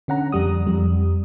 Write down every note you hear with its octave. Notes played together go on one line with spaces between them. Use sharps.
D3 C#4 F#5 A#5
F2 G3 D#6
F2 G3